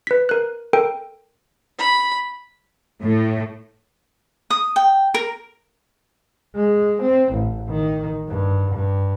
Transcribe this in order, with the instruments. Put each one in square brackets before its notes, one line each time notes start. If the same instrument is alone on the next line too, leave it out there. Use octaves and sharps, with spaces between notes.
[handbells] B4 B6
A#4 F#6
A4 A#4 G5
[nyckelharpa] B5
[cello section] A2
[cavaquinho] D#6
G5
A#4
[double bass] G#3
C4
A1
D#3
G2
G2